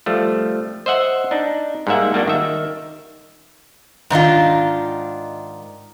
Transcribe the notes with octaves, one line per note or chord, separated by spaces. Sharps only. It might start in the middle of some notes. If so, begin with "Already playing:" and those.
F3 G3 A3
C5 D#5 E5 F#5
D4 D#4
G#2 G3 G#3 A#3 E5 F#5
G3 A#3 D4 F#4
D#3 E5
G#2 D#3 D4 F4